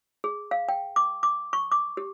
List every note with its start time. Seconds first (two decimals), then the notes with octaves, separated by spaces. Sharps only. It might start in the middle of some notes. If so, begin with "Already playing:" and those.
0.24 G#4
0.51 F5
0.69 G5
0.96 D6
1.23 D6
1.53 C#6
1.72 D6
1.97 G4